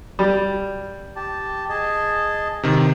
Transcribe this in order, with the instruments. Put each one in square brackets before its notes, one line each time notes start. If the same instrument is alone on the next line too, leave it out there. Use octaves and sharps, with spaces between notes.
[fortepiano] G3
[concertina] G4 A5
G#4 D#5 A5
[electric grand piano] C3 D#3